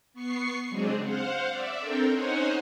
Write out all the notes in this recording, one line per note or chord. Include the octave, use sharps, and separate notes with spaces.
B3 C#6 C7
C#3 F#3 G#3 C4 D4 G#4
C5 F5 F#5
D5 E5
C4 D4 A4 A#4 G5
C#4 D#4 C5 C#5 F#5 G#5